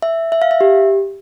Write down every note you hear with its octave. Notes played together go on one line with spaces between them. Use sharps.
E5
E5
F5
E5
G4